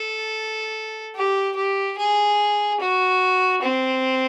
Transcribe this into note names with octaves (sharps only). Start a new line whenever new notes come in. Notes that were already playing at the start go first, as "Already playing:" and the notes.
Already playing: A4
G4
G4
G#4
F#4
C4